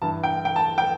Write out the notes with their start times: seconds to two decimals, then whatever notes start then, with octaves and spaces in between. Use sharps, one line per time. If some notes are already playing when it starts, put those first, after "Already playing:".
0.02 G2 E3 A5
0.23 G5
0.45 G5
0.56 A5
0.78 G5